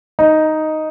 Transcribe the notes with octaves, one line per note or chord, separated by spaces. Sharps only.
D#4